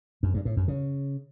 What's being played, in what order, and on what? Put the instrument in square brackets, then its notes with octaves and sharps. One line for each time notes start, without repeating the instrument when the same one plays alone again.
[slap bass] F#2
G2
A2
F#2
C#3